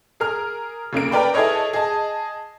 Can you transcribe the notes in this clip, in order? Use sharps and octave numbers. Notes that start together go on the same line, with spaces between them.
G#4 A#4 F6
F1 C#3 A#3 D7
A#4 B4 D5 G5 B5
E4 G#4 A4 B4 C#5 D#5
G#4 D#5 A5